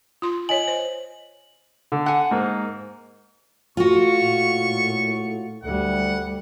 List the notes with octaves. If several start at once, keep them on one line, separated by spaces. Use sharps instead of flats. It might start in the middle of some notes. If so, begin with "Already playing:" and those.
F4 C6
F4 C#5 D#5 G#5 F#7
C5
D3
F#5 G#5
G#2 A#3
A2 F4 F#4 C#6
A#2
D2 G3 F#5